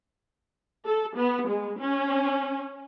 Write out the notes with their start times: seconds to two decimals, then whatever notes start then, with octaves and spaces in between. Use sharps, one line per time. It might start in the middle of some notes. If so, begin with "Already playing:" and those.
0.86 A4
1.17 B3
1.49 G#3
1.80 C#4